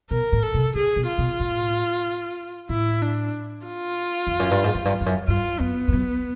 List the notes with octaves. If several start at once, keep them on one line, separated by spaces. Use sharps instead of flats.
B2 A#4
A2
A4
C3
C#3 G#4
B2
F4
B2
A2
A2 E4
D4
F4
F2
F#2
G2
G#2
F#2
G2
F2
F#2
G2 F4
F#2 B3
F2
F#2